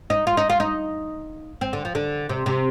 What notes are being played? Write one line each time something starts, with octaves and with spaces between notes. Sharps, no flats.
D#4
F4
D#4
F4
D#4
C4
D3
F3
D3
C3
C3